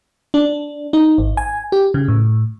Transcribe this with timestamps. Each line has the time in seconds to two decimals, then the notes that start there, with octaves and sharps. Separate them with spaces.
0.34 D4
0.93 D#4
1.18 G#1
1.37 G#5
1.72 G4
1.94 C#3
2.08 A2